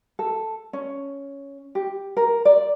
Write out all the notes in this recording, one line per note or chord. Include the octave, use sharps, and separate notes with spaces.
A4
C#4
G4
A#4
D5